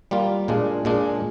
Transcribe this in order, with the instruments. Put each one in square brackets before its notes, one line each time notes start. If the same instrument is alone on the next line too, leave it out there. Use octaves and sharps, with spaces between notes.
[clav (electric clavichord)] G3 A#3 F4
A#2 G#3 D4
A#2 G#3 D4